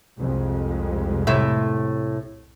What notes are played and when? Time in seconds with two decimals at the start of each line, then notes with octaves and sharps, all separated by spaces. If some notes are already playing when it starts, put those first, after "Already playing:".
0.18 C2 F2 G#3
1.27 A2 C3 E5